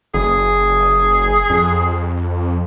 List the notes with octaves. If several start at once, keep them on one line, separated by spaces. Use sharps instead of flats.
F#1 G#4
F2